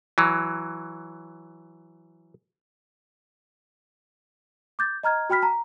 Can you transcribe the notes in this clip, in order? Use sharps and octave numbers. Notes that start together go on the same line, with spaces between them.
E3 F#3
D6 G6 A6
D#5 A#5 F6 G#6
F#4 G5 B5 F6 B6
A5 A#5